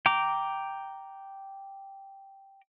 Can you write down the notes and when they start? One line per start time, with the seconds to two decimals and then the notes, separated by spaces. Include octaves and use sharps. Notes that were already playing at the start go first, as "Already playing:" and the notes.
0.06 G5 A#5 D6